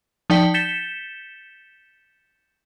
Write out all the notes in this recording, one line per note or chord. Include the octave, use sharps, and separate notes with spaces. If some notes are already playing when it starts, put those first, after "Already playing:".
F3 D#4 D5 G5 B6 G7
G6 A6 B6 C#7 E7 G7